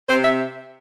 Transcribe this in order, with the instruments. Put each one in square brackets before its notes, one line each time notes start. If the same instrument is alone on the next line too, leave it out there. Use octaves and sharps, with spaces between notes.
[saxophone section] C3 C4 C5
E5